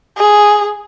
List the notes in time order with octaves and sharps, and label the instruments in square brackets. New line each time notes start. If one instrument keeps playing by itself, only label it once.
[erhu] G#4